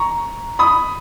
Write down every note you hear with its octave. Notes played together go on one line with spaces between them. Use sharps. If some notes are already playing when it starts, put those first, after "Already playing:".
Already playing: A#5 C#6
B5 D#6